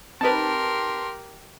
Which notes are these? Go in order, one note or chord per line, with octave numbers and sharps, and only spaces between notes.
C4 D#4 G4 A#4 B4 A5 C6